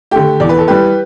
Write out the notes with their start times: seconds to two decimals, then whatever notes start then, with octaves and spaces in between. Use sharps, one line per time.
0.11 D3 A3 G4
0.40 E2 D5
0.49 B4
0.58 A4
0.68 E3 G3 G4 B4